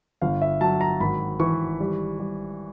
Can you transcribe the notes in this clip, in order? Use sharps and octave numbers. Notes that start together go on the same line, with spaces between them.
G1 F5
E5
F#3 A5
A#5
G#1 B5
E3 C#6
G3
G3